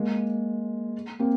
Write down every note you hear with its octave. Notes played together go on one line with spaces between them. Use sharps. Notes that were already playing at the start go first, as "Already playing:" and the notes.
Already playing: G#3 A#3
A#3 C4